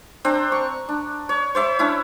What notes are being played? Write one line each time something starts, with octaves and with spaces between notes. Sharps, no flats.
C4 D4 C5 A#5
C#6
D4
C#5
C5 C#5 E5 B5
C#4 D4 E4